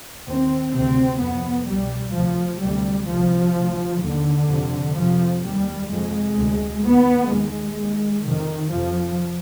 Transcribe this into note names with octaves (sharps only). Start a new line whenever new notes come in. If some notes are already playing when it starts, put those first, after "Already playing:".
D#2 C4
D2 C3 C4
F2 C3 B3
C2 B2 G3
D2 C3 F3
D2 C3 G3
C2 C3 F3
D2 C3
D#2 D3
F2 C3
F2 C3 F3
D#2 G3
F2 C3 G#3
D2 C3
D#2 B3
D#2 G#3
D#2
F2 C3 D#3
F2 C3 F3